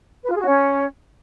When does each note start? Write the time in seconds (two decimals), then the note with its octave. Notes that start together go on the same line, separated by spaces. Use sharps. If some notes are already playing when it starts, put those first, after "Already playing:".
0.25 B4
0.30 F4
0.35 G#4
0.41 F#4
0.46 C#4